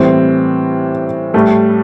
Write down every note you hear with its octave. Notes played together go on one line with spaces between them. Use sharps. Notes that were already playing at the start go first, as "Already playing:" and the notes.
Already playing: A2 E3 G3 C4
A2 G3 A3